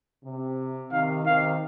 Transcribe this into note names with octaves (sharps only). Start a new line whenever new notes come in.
C3
C3 D#3 F5
C3 D#3 F5